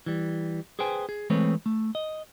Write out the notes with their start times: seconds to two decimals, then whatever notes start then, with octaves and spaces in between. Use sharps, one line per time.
0.06 E3 G3
0.79 G#4 B4 C5 G5 G#5
1.09 G#4
1.30 E3 G#3 A3 C4 B4 C#5
1.66 A3
1.95 D#5